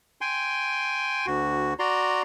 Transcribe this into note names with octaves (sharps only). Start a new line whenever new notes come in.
G5 G#5 C6
D2 F#4
F#4 D5 A#5 C6